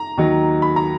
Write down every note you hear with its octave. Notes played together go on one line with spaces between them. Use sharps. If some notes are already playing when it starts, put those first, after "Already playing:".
Already playing: A#5
D#2 D#3 F#3
B5
A#5